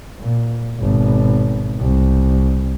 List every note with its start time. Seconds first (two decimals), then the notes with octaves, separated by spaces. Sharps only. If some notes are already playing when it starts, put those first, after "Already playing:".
0.20 A#2
0.79 G#1 B2
1.79 C2